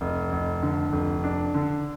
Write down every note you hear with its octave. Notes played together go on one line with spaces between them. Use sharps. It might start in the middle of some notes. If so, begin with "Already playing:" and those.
F1
F1
D3
F1
D4
D3